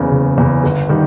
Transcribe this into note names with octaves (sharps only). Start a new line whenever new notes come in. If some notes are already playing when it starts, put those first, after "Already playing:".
Already playing: F#1 E2 C#3
F#1
E2 C#3
G1
D#3 G3